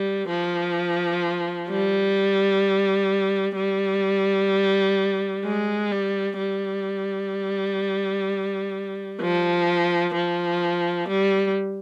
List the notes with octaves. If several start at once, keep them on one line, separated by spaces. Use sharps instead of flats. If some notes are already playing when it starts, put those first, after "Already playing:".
Already playing: G3
F3
G3
G3
G#3
G3
G3
F3
F3
G3